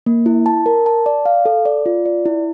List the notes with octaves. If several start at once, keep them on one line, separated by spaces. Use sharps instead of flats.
A#3
E4
A5
A#4
A5
D5
F5
A4
D5
F4
D5
E4